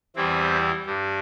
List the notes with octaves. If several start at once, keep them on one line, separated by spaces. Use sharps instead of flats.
E2 E3 G3 C4 E4
G2 G3